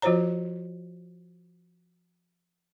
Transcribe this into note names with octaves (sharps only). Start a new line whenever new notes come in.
F3 F4 F#4 C5 C#5 A#5